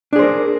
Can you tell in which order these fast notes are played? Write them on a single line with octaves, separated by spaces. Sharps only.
D4 G#4 C5 A#4